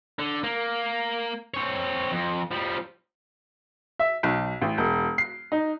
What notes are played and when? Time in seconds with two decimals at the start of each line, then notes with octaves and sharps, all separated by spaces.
0.19 D3
0.44 A#3
1.54 C4 C#5
2.11 F2
2.51 F3 G3
3.99 E5
4.23 B1
4.61 A1
4.78 E1
5.18 C7
5.52 D#4